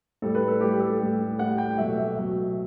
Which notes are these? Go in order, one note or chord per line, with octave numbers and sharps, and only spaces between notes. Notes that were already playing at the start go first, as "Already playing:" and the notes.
A2 G3 A4
B4
A4
A2 G3 G4
A4
A2 G3
A2 G3 F#5
G5
B2 F#3 A3 E5
E5
B2 F#3 A3